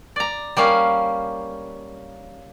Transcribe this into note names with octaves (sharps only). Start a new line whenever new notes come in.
D5 A#5
G3 A#3 C#4 F5